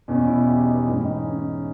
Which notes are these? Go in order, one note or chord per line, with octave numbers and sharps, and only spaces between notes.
E2 B2 C#4
E4
G4
D#4
B3
G#2 E3 C#4
D#4
C#4